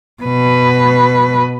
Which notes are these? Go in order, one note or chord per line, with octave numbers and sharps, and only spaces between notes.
B2 B4